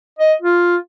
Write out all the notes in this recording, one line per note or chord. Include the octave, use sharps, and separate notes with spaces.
D#5
F4